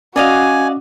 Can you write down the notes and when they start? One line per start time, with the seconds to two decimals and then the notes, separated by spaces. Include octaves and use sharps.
0.16 C#4 F#4 D5 D#5 F5 G#5